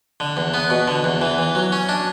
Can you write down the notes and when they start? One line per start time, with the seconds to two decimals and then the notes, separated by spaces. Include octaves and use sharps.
0.20 D3
0.37 E2
0.54 B3
0.70 B2
0.88 D3
1.04 E2
1.21 E3
1.38 E3
1.55 F#3
1.72 C#4
1.89 D4